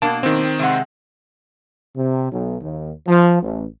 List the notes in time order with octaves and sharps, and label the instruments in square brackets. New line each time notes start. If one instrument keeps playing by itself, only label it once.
[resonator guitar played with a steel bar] B2 A#3 D4 [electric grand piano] A5
[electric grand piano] D#3 C4
[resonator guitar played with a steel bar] C3 G#3 F#5
[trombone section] C3
B1
D#2
F3
A1